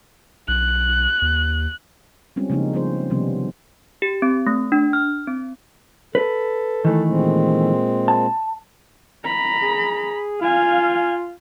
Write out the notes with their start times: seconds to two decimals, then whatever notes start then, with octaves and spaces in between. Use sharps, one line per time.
0.48 B1 F#6
1.22 D#2
2.36 G3 G#3 C4 C#4 F4
2.50 C#3 F3 G#3 A#3 D4 D#4
2.73 F3 B3 C4 F4 G#4 C5
3.10 C3 D#3 F3 G3 B3 C#4
4.02 G4
4.22 C4
4.47 A3
4.72 D4
4.93 F6
5.27 C4
6.15 A4 B4
6.85 D#3 E3 A3
7.08 A#2 G#3 C4
8.08 A5
9.24 A#5 B5
9.62 G#4
10.41 F4 F5 G#5